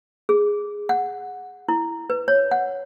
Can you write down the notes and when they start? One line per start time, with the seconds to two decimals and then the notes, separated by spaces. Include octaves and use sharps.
0.29 G#4
0.89 F#5
1.68 E4
2.10 B4
2.28 C#5
2.51 F#5